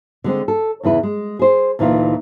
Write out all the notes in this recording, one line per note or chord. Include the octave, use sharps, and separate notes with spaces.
D3 G#3 C4
A4
E2 C#3 E4 B4
G#3
G#4 C5
D2 A#2 E3 D#4 F4